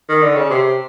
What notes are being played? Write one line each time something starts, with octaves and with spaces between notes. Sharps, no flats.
D#3
D3
C#3
C3